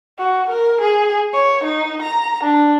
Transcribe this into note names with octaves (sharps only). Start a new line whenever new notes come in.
F#4
A#4
G#4
C#5
D#4
A#5
D4